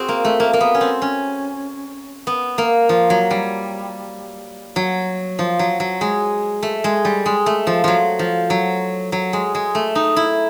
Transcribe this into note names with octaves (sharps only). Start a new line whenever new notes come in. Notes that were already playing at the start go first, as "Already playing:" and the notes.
Already playing: C4 F#4 G#4
A#3
A3
A#3
A#3
B3
C#4
C4
C#4
B3
A#3
F3
F#3
G3
F#3
F3
F#3
F#3
G#3
A3
G#3
G3
G#3
A3
F3
F3 F#3
F3
F#3
F#3
G#3
G#3
A3
D#4
E4